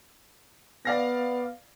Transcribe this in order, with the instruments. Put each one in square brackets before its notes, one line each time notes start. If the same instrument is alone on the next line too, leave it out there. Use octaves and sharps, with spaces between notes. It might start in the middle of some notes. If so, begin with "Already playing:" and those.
[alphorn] B3 [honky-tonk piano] D5 F5 A#6